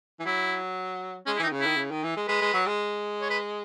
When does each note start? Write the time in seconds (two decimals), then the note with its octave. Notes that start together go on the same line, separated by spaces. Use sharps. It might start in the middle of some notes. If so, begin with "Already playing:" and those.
0.20 E3
0.25 F#3 E4
1.26 G#3 C#4
1.36 E4
1.39 E3 D#4
1.47 D#3
1.52 C#3
1.61 D#3 E4
1.77 C#3
1.90 D#3
2.04 E3
2.16 G#3
2.28 G#3 B4
2.42 G#3
2.53 F#3
2.66 G#3
3.21 C#5
3.30 B4